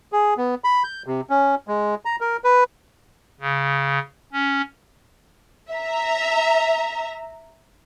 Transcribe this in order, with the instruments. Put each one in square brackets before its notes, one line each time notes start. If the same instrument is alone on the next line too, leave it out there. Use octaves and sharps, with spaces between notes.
[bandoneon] G#4
B3
B5
G6
C3
C#4
G#3
A#5
A#4
B4
[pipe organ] C#3
C#4
[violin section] E5 A#5